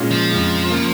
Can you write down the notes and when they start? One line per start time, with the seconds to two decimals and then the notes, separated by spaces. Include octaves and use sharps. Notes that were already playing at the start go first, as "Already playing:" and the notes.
Already playing: A#2 G#3 C#4 F4
0.11 F3
0.30 F2 C#3 G#3
0.70 C#3 A#3